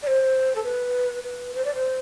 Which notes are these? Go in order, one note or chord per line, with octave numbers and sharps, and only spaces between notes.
D5
C5
A4
B4
B4
C5
D5
C5